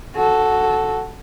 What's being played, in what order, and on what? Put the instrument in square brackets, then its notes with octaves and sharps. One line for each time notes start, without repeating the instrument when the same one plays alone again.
[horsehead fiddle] F#4 A4